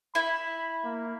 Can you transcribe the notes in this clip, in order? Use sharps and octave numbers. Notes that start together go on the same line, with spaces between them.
E4 B5
A#3